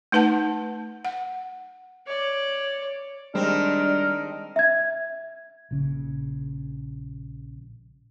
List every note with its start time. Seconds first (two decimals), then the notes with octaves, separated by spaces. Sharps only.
0.12 A3 D#4 B4 F#5 A5
1.05 F#5
2.07 C#5 D5
3.35 D#3 G3 G#3 C4 D4 A#4
4.56 E5 G#6
5.71 A#1 C#3